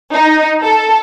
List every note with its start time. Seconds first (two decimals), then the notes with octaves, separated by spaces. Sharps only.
0.14 D#4
0.63 A4